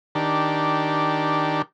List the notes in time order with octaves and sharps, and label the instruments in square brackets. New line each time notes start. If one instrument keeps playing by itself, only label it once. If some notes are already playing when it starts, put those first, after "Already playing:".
[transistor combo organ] D#3 D4 G4